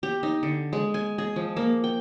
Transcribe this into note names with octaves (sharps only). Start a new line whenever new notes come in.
G4
D#4
D3
G#3
G#5
G#4
F3
A#3
G5